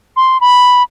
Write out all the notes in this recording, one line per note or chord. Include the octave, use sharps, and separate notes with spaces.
C6
B5